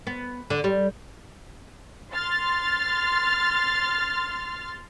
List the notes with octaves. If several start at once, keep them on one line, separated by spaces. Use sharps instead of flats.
B3
D3
G3
C6 F6 A6